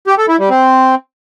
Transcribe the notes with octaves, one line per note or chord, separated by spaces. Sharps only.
G4
A4
E4
G3
C4